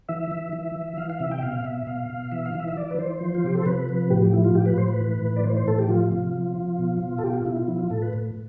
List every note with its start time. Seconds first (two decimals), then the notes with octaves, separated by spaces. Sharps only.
0.09 E3 E5
0.31 E3
0.53 E3
0.75 E3
0.97 E3 F5
1.10 F5
1.20 C3 E5
1.31 G5
1.38 E5
1.42 B2 F5
1.64 B2 E5
1.87 B2 F5
2.10 B2
2.31 E3 E5
2.46 F5
2.55 E3 E5
2.68 E5
2.76 E3 D5
2.91 B4
2.98 E3 C5
3.21 F3
3.35 F4
3.44 C3 G4
3.55 A4
3.66 C3 B4
3.89 F3
4.10 A2 G4
4.22 G4
4.33 F3 E4
4.44 F4
4.55 A2 G4
4.66 B4
4.77 A2 C5
4.88 B4
5.00 E3
5.22 A2
5.36 D5
5.44 E3 C5
5.56 C5
5.68 A2 A4
5.79 G4
5.89 F3 F4
6.12 C3
6.33 F3
6.56 F3
6.79 B2
7.01 B2
7.18 A4
7.24 B2 G4
7.34 F4
7.45 B2 E4
7.57 F4
7.68 F3 E4
7.79 F4
7.90 A2 A4
8.02 B4
8.13 A2